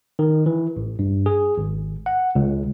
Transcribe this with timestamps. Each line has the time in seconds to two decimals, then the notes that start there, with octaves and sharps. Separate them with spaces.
0.19 D#3
0.46 E3
0.77 A1
0.99 G2
1.26 G#4
1.58 G#1
2.06 F#5
2.35 C#2